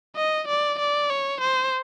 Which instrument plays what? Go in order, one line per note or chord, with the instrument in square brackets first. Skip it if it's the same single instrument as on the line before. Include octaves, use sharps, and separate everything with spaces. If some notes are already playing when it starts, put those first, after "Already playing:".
[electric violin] D#5
D5
D5
C#5
C5